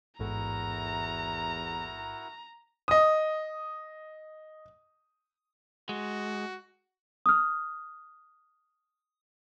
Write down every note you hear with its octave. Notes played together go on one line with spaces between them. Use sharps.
A1 E2 G#2 E4 F#4 A4 A#4 A#5
D#5 D#6
G#3 F#4
D#6 F6